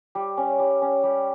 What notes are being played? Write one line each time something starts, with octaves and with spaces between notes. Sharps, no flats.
G3
C#4
G3
C#4
G3